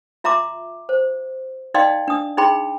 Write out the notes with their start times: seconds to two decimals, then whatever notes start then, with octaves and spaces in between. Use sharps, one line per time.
0.24 F4 E5 A#5 C6 D6
0.89 C5
1.74 D#4 D5 D#5 F5 G5 C6
2.08 D4 D#6
2.38 D#4 G#4 G5 B5 C6